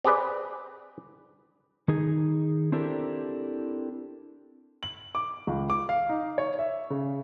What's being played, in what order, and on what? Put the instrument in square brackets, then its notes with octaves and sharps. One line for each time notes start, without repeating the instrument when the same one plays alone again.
[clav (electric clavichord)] C4 G4 G#4 B4 D5
[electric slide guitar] D#3 D#4 G#4
C4 D4 E4 G4 A4 A#4
[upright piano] F#7
D6
C#2
D6
F5
D#4
C#5
E5
C#3